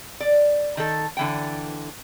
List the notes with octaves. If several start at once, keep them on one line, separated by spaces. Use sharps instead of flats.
D5
D#3 A4
D3 E3 G5